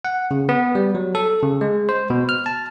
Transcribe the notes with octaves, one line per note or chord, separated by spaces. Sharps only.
F#5
C#3
B3
G3
F#3
A4
C#3
G#3
C5
B2
F6
A5